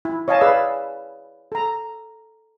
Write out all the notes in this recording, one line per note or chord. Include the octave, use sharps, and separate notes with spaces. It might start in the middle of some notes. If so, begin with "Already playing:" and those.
E4
C#5 D#5 F5 G#5 A5
G#4 B4 D5 E5 F5 E6
A4 A#5